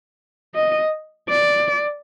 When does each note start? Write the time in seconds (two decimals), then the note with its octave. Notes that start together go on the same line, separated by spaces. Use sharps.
0.55 D#5
1.29 D5